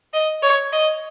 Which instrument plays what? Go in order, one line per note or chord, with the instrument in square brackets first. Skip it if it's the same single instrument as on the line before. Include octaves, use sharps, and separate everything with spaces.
[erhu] D#5
C#5
D#5